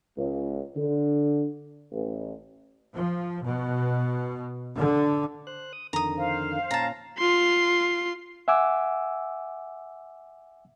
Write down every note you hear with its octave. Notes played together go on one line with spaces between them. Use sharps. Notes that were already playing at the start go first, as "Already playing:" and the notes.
C#2
D3
A1
F3
B2
D3
C5 F#6
D#6
F2 D3 D#3 A#5 D#6
C5 F5
A#2 C#4 A5 A#5
F4 C6
E5 F#5 G#5 D6 E6